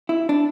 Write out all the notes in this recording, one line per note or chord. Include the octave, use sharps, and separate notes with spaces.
E4
D4